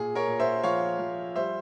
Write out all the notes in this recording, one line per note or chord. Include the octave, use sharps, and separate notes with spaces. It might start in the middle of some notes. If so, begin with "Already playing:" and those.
Already playing: A#2 G#4
A#4 C#5
A#2
C5 E5
F3 C#5 F5
F3
G3 C5 E5